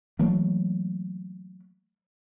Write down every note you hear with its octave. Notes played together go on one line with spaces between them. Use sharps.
E3 F#3 A3 A#3